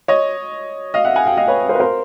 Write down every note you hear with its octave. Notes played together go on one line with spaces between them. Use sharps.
C#5 D#5
D#5 F5
E5 F#5
F#5 G#5
F5 G5
D#5 F5
B4 C#5
A#4 C5
B4
A#4 C5